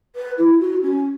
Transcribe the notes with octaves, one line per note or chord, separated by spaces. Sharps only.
B4
E4
F#4
C#4